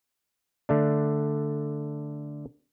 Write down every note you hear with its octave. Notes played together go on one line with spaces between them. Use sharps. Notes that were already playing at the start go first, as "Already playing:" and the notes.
D3 A3 D4